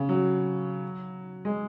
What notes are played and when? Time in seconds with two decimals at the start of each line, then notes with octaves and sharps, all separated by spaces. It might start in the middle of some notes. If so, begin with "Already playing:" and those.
Already playing: C#3
0.09 F#3
1.45 G#3